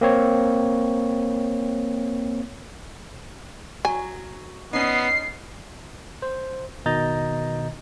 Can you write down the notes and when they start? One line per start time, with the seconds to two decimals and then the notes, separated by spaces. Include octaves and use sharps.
0.01 A#3 C4 C#5
3.85 F#3 G#5
4.73 B3 C#4 D#4 C7
6.22 C5
6.86 B2 D#3 D#5 A#5 G6 A6